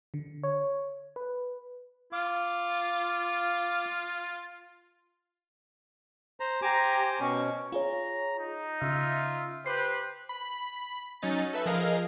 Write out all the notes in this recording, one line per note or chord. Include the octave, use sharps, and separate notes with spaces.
D3
C#5
B4
F4 F5 D6
C5 A#5
G4 C5 G#5 A#5 D6
B2 C#4 C#6
F4 G#4 C#5 A#5
D#4
C#3 F4 E5
G4 B4 C5 C7
B5
F#3 C#4 D#4 A6
A4 B4 E5
F3 G#4 A#4 D#5 F5